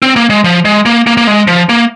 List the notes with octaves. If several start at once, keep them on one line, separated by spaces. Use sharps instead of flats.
C4
A#3
G#3
F3
G#3
A#3
A#3
A#3
G#3
F3
A#3